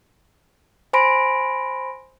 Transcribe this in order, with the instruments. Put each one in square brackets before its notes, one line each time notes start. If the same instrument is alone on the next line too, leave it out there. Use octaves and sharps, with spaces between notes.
[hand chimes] C5 G#5 B5 C6 A#6 D7